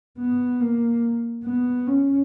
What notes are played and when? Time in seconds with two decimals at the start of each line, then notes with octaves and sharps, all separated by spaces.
0.18 B3
0.60 A#3
1.45 B3
1.87 C#4